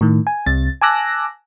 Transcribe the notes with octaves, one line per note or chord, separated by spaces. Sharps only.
A2 D#3
G#5
C2 C3 A6
G#5 A5 D6 E6 F#6 A#6